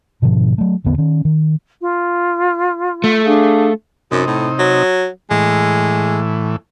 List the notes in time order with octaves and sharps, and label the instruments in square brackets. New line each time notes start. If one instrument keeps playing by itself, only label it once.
[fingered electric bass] G#2 B2 D3 F3
F#3 A3
A1 E2 D3 B3
D#3 C#4
D#3
[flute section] F4
[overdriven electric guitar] A3
[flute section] D4 G#4 F5
[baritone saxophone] F#2 [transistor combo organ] C3 D#4
[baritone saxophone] A2
F#3
[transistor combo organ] A2 E3 [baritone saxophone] G#3